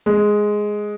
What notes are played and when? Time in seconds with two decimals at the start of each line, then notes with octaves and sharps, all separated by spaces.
0.06 G#3